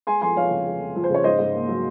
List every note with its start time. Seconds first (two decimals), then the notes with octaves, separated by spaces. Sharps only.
0.07 G#3 G#5 C6
0.21 F2 G#5 C6
0.36 F3 C#5 F5
0.51 C#3
0.66 G#3
0.80 F2
0.96 F3
1.04 C5
1.10 C#3 C#5
1.24 G#2 C5 D#5
1.39 G#2
1.55 A#3
1.69 F#3